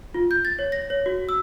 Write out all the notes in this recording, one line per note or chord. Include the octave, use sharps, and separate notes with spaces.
F4
G6
A6
C#5
A#6
C#5
F#4
E6